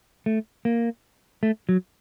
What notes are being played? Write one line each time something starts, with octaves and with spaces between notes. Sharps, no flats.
A3
A#3
A3
F#3